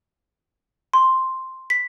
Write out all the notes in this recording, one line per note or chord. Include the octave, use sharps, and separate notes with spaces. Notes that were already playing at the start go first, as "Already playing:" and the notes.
C6
B6